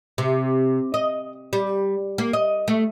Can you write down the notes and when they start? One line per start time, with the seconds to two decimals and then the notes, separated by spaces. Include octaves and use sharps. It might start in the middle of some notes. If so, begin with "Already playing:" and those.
0.18 C3
0.94 D#5
1.53 G3
2.18 A#3
2.33 D#5
2.68 A3